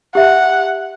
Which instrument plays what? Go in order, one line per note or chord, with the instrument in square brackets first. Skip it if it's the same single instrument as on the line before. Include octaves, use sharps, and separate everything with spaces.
[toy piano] G4 E5 [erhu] F#5